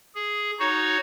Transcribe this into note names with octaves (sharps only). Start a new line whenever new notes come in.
G#4
D#4 F#4 C#5